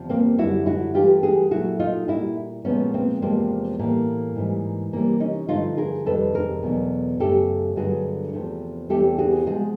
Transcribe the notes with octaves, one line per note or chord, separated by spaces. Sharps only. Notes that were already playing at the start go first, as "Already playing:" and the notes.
Already playing: E2 C3 F3
A#3 C4
F#2 D3 G3 E4 F#4
E4 F#4
G2 E3 A3 F4 G4
F#4 G#4
A#2 F#3 A3 E4 F#4
D#4 F4
A#2 G3 E4 F#4
A#2 F3 G#3 B3 C#4
A#3 C4
E2 C3 F3 G#3 A#3 C4
A2 E3 G3 A#3
G#2 E3 G3
C3 E3 G3 A#3
C#4 D#4
G2 D3 F3 A3 D#4 F4
G#4 A#4
F2 C3 D#3 G3 A4 B4
G#4 A#4
E2 B2 F#3 A3
F#2 C#3 F#3 A3 G4 A4
G2 D3 F#3 A3 F#4 G#4
E2 C3 F3 A3
E2 C3 E3 A3 G4 A4
F#4 G#4
C3 F3 G#3 F#4 G#4